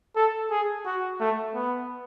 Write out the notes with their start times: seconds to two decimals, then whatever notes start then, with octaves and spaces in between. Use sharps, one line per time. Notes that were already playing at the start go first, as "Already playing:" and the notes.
0.16 A4
0.51 G#4
0.86 F#4
1.20 A3
1.55 B3